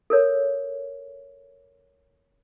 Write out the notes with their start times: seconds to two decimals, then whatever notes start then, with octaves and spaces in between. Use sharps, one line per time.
0.10 A4 A#4 C#5